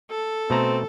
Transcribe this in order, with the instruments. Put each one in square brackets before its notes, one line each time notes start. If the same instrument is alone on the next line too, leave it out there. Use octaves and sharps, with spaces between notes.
[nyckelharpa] A4
[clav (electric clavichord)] B2 A3 A#5 [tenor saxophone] C4